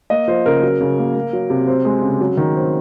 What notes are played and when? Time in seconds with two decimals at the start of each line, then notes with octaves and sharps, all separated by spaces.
0.10 A#3 D#5
0.28 F3 C5
0.46 C#3 A#4
0.63 F#3
0.81 C#3
0.98 A#3
1.15 A#3
1.33 F#3
1.50 C3
1.68 C4
1.85 G#3
2.02 C#3
2.21 F#3
2.37 D#3
2.56 C4